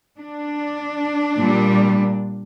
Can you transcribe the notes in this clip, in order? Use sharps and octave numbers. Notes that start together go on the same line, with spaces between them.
D4
A#2 G3